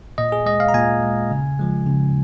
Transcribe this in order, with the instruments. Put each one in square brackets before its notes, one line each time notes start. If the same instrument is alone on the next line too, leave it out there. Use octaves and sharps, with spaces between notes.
[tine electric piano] A#2 D#5
G#4
G#3 D#5
F5
A#5
A#2 G#5
G#3
C#3
F3 G#3
C#3